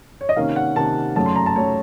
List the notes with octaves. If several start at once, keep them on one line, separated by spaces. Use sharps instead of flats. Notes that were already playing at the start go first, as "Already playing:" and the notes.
C#5
D#5
C3 D#3 A#3 C#4 F5
F#5
C3 D#3 A#3 C#4 A5
F#2 C#3 F#3 A3 A5
C6
A#5
A5
C#3 F#3 A3 C#5